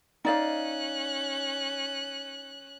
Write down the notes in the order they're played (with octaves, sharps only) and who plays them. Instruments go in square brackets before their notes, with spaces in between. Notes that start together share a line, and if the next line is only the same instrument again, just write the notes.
[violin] C#4 F#6 [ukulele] D#4 D5 F5